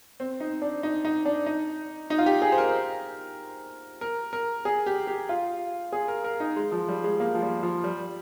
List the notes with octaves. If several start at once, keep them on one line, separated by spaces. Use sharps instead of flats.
C4
D#4
D4
D#4
D#4
D4
D#4
D#4
F4
G4
G#4
C5
A#4
A#4
A#4
G#4
G4
G4
F4
G#4
A#4
A#4
D#4
G#3
F3
G3
G#3
A#3
F3
G3
F3
G3